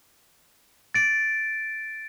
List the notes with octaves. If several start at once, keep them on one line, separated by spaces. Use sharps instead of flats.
A6 D7